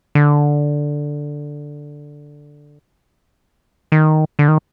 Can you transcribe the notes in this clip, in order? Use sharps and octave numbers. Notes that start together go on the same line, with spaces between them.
D3
D#3
D3
D#3